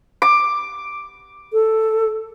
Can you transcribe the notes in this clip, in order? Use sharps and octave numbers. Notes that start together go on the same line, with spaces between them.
D6
A4